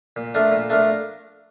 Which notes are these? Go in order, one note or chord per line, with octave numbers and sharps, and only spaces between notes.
A#2
A3 D4 F4 A#4
A#2
A3 D4 F4 A#4